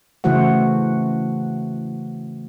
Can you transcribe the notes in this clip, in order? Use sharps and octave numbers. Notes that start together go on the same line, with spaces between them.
C#3 E3 A3 F#4 C5 F#5